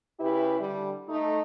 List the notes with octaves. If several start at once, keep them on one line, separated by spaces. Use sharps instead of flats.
C#3 E4 G4 B4
D3 G3
A3 D#4